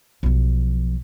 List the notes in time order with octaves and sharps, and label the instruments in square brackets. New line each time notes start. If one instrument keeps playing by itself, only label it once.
[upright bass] B1 F3